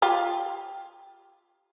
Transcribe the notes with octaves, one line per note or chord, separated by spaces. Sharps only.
F4 G4